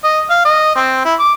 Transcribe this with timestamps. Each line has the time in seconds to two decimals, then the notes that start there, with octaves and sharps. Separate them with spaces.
0.04 D#5
0.30 F5
0.45 D#5
0.75 C4
1.05 E4
1.19 D6